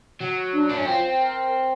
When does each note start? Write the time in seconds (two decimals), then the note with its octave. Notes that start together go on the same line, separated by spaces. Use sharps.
0.20 F#3
0.53 D4
0.70 D4
0.77 C#4
0.86 C4 F4
1.18 A#4